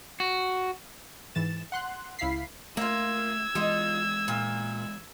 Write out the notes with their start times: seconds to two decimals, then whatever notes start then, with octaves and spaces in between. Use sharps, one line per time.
0.20 F#4
1.35 G#2 E3 A6 E7
1.72 F#5 C6 F#6
2.19 C#2 E4 F5 B5 B6 C7
2.77 A3 A#3 F4 E6 G#6
3.55 E3 G#3 D#4 F4 D#5
4.28 A#2